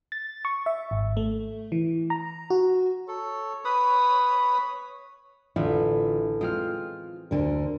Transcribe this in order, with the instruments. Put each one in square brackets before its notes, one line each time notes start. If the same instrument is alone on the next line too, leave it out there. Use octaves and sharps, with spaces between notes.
[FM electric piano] A6
C#6
E5
G#1
A3
E3
A#5
F#4
[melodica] A4 [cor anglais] C#5
[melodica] B4 B5 D#6
[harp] A1 [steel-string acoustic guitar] D3 F4 E5
[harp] G#3 C4 F6 [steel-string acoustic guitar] F4
[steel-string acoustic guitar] D2 D3 A#4